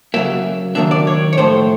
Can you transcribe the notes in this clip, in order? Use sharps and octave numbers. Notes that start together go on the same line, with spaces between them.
C#3 F#3 A#3 E5
D#3 F#3 A#3 D4 E5
D5
C#5
C#5
A2 F3 A3 C5